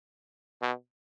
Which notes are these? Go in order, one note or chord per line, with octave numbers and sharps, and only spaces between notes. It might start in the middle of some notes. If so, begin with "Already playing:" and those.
B2